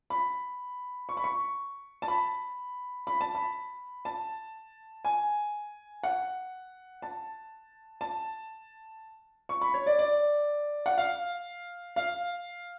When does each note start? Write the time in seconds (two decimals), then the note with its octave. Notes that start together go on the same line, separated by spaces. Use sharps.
0.10 B5
1.09 C#6
1.17 B5
1.24 C#6
2.02 A5
2.08 B5
3.07 B5
3.21 A5
3.35 B5
4.05 A5
5.05 G#5
6.03 F#5
7.02 A5
8.01 A5
9.49 C#6
9.61 B5
9.74 C#5
9.86 D5
9.99 D5
10.86 F#5
10.98 F5
11.96 F5